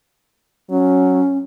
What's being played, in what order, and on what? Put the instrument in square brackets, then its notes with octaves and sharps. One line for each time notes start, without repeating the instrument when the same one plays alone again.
[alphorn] F#3 [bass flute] C#4